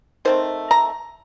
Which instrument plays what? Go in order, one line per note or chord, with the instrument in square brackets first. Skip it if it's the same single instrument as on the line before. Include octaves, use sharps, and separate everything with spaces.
[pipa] D#3 A3 C4 C5
A#5